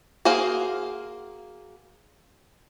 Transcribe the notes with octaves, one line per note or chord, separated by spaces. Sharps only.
A#3 F#4 G#4 C5 F5